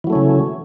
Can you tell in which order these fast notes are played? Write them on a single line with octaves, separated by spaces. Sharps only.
E3 F#3 A3 C#4 C#3